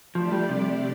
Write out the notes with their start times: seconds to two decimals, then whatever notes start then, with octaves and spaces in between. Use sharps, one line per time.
0.15 F3 A3 D4 G4 D5
0.32 G3
0.49 C3